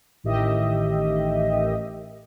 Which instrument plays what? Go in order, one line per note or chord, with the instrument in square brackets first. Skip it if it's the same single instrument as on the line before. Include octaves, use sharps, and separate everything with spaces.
[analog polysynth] A1 A2 D#3 G4 D#5 E5